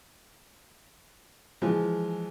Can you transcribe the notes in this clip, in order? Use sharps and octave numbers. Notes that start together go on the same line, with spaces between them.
E3 F3 G#3